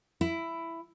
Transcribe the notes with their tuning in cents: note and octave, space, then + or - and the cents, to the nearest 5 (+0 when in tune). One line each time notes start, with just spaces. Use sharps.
E4 +10